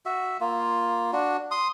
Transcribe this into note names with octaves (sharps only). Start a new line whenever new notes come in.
F#4 E5
A#3 F4
D4 F#4
C6 D#6